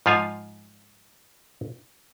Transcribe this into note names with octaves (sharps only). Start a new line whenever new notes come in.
G#2 F3 F4 F5 G#5